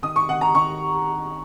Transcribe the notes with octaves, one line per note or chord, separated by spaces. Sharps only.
D#3 D#6
C#6
D#3 F#5
A#5
D#3 C#6